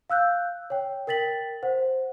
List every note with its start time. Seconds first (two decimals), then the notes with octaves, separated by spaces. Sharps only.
0.10 F5 E6 F#6 G6
0.70 C#5 G5
1.07 A#4 G5 A6 B6 F#7
1.63 C5 F#5